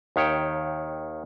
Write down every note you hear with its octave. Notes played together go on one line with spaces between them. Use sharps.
D#2 D#3 C#5 E5 G5